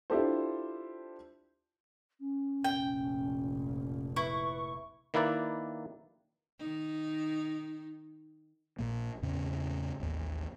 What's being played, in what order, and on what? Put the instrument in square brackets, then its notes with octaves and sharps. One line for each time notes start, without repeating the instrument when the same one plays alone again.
[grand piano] D4 E4 F4 G4 A4 C5
[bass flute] C#4
[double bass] F1 A#1 [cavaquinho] G5
[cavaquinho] E4 [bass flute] B4 [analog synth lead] C#6
[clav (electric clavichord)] D#3 A#3 E4 B4 D5
[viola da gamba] D#3 D#4
[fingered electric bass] A#1 F2 A#2 A#3
E2 A2 C#3 C4
D#1 A1 D#2